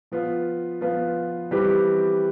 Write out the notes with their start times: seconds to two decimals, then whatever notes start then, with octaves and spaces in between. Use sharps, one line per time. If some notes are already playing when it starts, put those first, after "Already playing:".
0.12 F3 B3 F4 B4
0.81 F3 B3 F4 B4
1.51 E3 G3 C4 G4 B4